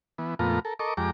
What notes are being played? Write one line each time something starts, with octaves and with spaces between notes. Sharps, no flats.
E3 B3
F2 A#2 A3 B3 F4 A#5
A4 A#4
A4 A#4 D#5 C#6 D6
F2 G#3 G4 A#5 D6